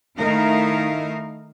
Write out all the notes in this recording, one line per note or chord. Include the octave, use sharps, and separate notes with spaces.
D#3 A3 D#4 E4 A#4 F5